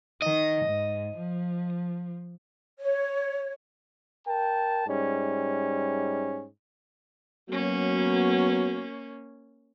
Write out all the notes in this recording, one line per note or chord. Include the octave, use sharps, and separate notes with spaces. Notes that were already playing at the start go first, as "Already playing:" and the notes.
D#3 D#5
G#2
F3
C#5
A#4 G5 A5
G#2 G3 C#4
F#3 A#3 B3 C#4 F#4